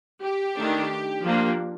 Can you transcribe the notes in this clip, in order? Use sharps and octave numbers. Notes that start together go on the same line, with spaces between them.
G4
D#3 A3 D4
F3 A#3 D4